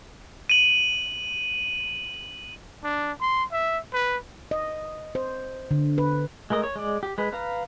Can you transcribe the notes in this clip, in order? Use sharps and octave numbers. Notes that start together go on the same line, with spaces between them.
D#7 F#7
D4
C6
E5
B4
D#5
C5
D3
B4
G#3 A3 A#4 D#5
C#5
G#3 D5
G4
G#3 B4
B4 F5 A#5